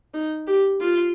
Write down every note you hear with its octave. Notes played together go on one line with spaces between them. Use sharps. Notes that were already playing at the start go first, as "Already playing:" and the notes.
D#4
G4
F4